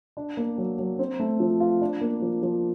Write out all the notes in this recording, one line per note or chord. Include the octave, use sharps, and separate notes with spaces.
D4
A#3
F#3
F#3
C4
A3
F3
F4
D4
A#3
F3
F3